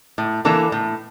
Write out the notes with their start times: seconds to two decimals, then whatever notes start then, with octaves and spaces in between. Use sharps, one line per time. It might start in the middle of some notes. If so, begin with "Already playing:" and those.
0.18 A2
0.45 E3 A#3 D4 A4
0.72 A2